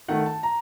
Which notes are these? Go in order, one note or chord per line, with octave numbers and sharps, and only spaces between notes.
D#3 A3 F#5
A5
A#5